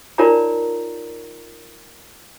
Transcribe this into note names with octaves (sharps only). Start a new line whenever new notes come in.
D#4 F4 A#4 C#5 D5 A#5